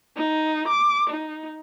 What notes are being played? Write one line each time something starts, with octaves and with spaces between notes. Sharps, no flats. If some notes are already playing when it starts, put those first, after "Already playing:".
D#4
D6
D#4